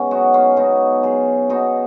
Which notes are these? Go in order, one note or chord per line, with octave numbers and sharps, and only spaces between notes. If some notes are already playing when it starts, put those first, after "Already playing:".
Already playing: G#2 B3 C#4
F#3 D#4 F#4
C#4 F4
B2 D#4 F#4
F#3 F4 G#4
B2 D#4 F#4